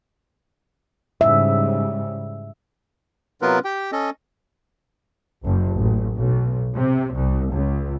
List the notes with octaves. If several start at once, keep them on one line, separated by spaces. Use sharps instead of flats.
G#2 C#3 G3 E5
C3 F#3 B3 F4 A#4 B4
G4 G5
C#4 A4 D#5
F#1
A1
B1
C3
C2
C#2